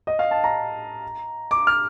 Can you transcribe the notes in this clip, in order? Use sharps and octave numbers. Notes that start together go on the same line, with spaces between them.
D#5
F5
A5
A#5
D6
F6